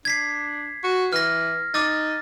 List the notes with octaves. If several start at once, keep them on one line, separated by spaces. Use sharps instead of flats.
D4 G#6 B6 C7
F#4
E3 F6 A#6
D#4 D6 E6 A6